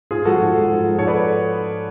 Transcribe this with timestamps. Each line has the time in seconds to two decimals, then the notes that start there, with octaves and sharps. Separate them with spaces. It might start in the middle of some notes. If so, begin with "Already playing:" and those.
0.11 G#2 F4 G#4
0.25 F3 G#3 F#4 A4
0.41 G#2
0.54 F3 G#3
0.70 G#2
0.83 F3 G#3
0.98 G#2 A4 C#5
1.07 B4 D5